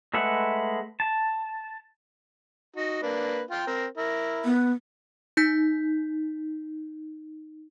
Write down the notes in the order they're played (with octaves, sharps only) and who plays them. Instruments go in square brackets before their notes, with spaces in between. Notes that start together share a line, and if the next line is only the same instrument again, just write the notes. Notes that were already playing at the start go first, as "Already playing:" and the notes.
[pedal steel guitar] G#3 A3 B4 E5 F#5
A5
[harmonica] D#4 F#4
A#3 D4 B4
F4 F5 G5
C4 A#4
E4 A#4
[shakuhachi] B3
[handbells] D#4 G6 B6